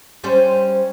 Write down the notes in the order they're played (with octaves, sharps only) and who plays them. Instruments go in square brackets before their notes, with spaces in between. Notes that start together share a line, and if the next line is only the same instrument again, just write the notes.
[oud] G3 C#4 C5